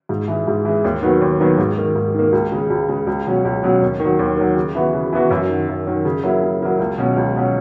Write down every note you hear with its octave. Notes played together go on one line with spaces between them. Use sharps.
G#2
E3 G#3
G#2
E3 G#3
D#2
D#3 F#3 B3 F#4
D#2
D#3 F#3 B3 F#4
G#2
D#3 A#3
G#2
D#3 A#3
C#2
C#3 G#3
C#2
C#3 G#3
C#2
B2 F#3 C#4
C#2
B2 F#3 C#4
D#2
D#3
F#3
D#2
D#3 F#3
C#3
E3 B3 F#4
C#3
E3 B3 F#4
F#2
D#3 F#3
F#2
D#3 F#3
C#3
F#3 A#3 E4
C#3
F#3 A#3 E4
C#2
B2 F#3 C#4
C#2
B2 F#3 C#4